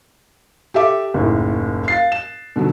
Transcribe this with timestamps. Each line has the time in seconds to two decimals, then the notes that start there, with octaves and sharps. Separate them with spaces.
0.74 G4 A4 E5 D6
1.14 F#1 D#2 A2
1.88 F5 A6 C7
2.12 E7
2.56 B2 D3 D#3 F#3